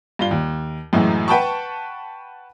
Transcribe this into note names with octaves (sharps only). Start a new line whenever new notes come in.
G2 F4 G7
D#2
F#2 A2 E3 F#3 G#3
B4 F#5 G5 A5 B5 C#6